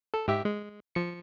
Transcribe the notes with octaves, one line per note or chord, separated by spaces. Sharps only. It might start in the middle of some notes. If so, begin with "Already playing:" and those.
A4
G#2 G4 E5
G#3
F3 C#7